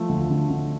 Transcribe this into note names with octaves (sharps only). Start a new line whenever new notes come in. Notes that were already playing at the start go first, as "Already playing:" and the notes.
Already playing: F3 A3
D2
D3
D3